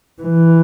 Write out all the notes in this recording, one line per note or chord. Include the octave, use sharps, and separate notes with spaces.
E3